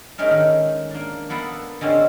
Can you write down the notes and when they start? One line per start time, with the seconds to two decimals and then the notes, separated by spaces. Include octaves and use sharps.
0.18 G#3 A3 C#4 D#4 A#4
0.31 D#3
0.91 A#3 D4
1.30 A#3 B3 A4 B4 F#5
1.81 D3 G#3 C4 C#4